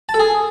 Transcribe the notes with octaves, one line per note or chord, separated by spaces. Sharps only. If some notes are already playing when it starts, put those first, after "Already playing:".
A5
A4
G#4